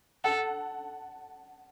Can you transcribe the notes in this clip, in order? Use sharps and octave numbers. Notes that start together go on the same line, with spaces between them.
A4 F#5 A5